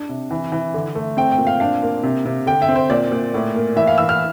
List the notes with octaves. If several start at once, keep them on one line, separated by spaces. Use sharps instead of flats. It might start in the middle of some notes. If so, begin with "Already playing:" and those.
Already playing: D4
C3
E3
E3
D3
A3
C4 G5
G5
A#2
F5
D4 F5
A#3
C3
C3
D3 G5
E5
C4
C5
A#2 D5
A#2
A2
A#3
E3 E5
F5
E3 E6
F6